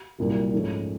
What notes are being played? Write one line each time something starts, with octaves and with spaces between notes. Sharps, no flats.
C2 A#2 F#3
G#2 F3 A3 C#4